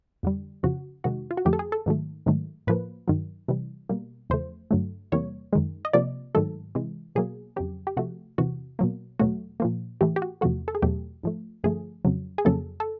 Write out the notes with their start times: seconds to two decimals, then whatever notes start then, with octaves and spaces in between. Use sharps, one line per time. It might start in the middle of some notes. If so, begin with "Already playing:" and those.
0.23 F2 D3 G3
0.63 F2 C#3 F3 F#4
1.04 F2 C3 D#3 G#3 F#4
1.31 F4
1.37 F#4
1.45 F2 D3 F3 A3 G4
1.53 A4
1.59 G#4
1.72 A4
1.86 G#2 D#3 F#3 A3
2.26 G#2 D#3 F#3 A3
2.67 A2 F3 A#3 B4
3.08 G2 D#3 F#3
3.48 C3 E3 G3
3.89 B2 G3 A#3
4.30 E2 C#3 F3 A3 C5
4.71 G2 D3 F#3 A3
5.12 E2 C3 E3 G3 A#3 C#5
5.53 F#2 D#3 G#3
5.85 D#5
5.93 C3 F3 A#3 D5
6.35 G#2 D#3 F#3 A3 A4
6.75 C3 E3 G#3
7.15 B2 F#3 A#3 G#4
7.56 F2 C#3 F#3 G4
7.87 G4
7.97 C3 F3 A3 F#4
8.38 E2 C3 E3 F#4
8.79 B2 F#3 A#3
9.19 E2 B2 F#3 A3 F#4
9.60 A#2 F3 A#3
10.01 A2 E3 A3 G4
10.16 G4
10.22 F#4
10.41 E2 C3 F3 A3 F#4
10.68 A4
10.75 G#4
10.82 E2 B2 F#3 A3 G4
11.23 G#2 F3 A3
11.64 G2 D3 F3 A3 G#4
12.05 F2 C#3 F#3
12.38 G#4
12.45 F2 C#3 F#3 A#3 A4
12.80 A4